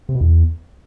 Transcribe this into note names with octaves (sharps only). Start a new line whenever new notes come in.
C3
B2
E2